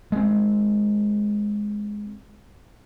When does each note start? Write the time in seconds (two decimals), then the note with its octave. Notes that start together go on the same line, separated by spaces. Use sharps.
0.12 G#3 C4